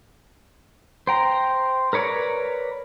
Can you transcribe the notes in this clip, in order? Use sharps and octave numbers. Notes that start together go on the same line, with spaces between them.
C5 G5 A#5
A#4 B4 C#5 D5 A#5